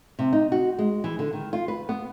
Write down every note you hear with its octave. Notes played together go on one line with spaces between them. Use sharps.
C3
D#4
F#4
G#3
E3
D3
D#3
F4
B4
B3